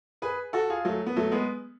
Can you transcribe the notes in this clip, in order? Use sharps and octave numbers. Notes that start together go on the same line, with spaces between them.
G#4 B4
F#4 A4
F4 G#4
F#3 A3
B3
F#3 A3
G#3 B3